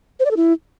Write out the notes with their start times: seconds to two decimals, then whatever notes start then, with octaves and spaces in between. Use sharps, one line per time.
0.20 C5
0.25 D5
0.31 A4
0.37 E4